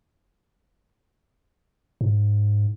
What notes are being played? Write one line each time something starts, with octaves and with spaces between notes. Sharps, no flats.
G#2